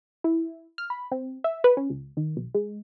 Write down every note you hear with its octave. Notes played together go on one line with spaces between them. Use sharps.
E4
F6
B5
C4
E5
B4
C#4
C#2
D#3
B1
G#3